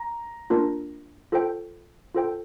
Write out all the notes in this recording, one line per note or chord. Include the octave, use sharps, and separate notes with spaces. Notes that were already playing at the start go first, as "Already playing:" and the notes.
Already playing: A#5
A#3 D4 F4 A#4
F4 A4 C5 G5
F4 A4 C5 G5